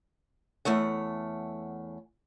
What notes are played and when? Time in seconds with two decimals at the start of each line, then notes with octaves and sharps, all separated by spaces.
0.65 E2 A3 C#5 F#5